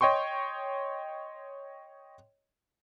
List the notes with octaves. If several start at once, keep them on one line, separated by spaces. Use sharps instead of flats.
C#5 D#5 G5 C6 C#6